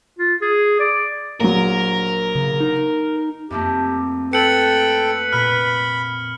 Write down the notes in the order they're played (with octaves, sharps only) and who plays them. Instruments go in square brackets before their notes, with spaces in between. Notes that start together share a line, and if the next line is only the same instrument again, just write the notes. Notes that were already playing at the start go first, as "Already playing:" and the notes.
[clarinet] F4
G#4
D5
[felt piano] A#1 F#3 [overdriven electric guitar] A#4
[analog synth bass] C#3
D#4
[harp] F2 A3 A#3 [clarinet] G4
[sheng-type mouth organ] A4 G5 [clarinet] B4 [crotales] C#7 F#7
[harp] A#2 [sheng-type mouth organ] B5 [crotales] F6